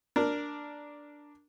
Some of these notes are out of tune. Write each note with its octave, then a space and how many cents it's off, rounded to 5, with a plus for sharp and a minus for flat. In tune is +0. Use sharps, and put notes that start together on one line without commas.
D4 +0 A#4 +0